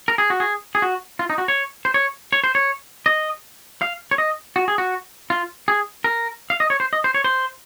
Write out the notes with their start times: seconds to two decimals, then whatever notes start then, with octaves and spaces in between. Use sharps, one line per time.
0.08 A#4
0.18 G#4
0.30 F#4
0.40 G#4
0.75 G#4
0.82 F#4
1.19 F4
1.30 D#4
1.38 F#4
1.48 C#5
1.85 C5
1.94 C#5
2.33 C#5
2.44 C5
2.55 C#5
3.06 D#5
3.82 F5
4.11 C#5
4.18 D#5
4.56 F#4
4.68 G#4
4.78 F#4
5.30 F4
5.68 G#4
6.04 A#4
6.50 F5
6.60 D#5
6.70 C#5
6.80 C5
6.93 D#5
7.04 C5
7.14 C#5
7.24 C5